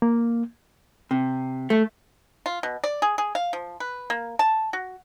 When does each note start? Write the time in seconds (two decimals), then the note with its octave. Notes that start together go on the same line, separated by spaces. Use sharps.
0.02 A#3
1.11 C3
1.70 A3
2.46 F4
2.63 B2
2.84 D5
3.02 G#4
3.18 G#4
3.35 F5
3.53 F3
3.80 B4
4.10 A#3
4.39 A5
4.73 F#4